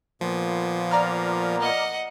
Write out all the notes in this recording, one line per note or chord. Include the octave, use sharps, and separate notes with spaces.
A#2 F3 A#3 B3
D5 A#5 F6
D#5 F#5